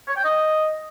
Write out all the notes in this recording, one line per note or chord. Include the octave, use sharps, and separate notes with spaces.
C#5
G5
D#5